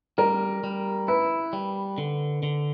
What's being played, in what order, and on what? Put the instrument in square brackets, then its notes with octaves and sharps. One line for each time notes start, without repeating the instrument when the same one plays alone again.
[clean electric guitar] G3 [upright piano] A#4
[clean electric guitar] G3
[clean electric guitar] E4 [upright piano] B4
[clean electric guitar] G3
D3
D3